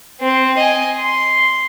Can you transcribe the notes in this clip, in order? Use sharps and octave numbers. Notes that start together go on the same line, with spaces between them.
C4
D#5 G#5
C6